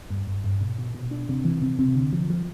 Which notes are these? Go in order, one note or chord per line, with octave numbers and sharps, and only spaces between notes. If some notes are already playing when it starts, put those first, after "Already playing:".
G2
G2
G2
B2
B2
B2
D4
C3
E3
C3
C3
D3
F3
F3